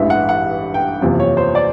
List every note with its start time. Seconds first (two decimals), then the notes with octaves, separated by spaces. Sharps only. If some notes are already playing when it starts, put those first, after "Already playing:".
Already playing: A1 G2 E3 G#3 E5
0.10 F#5
0.29 F#5
0.74 G5
1.01 F#1 E2 C3 F3
1.20 C#5
1.37 C5
1.55 D5